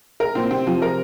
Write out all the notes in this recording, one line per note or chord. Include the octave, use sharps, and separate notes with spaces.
A#4
A#2 C4
C3 C4
C3 F3
A#4